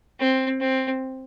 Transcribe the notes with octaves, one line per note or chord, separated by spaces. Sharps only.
C4
C4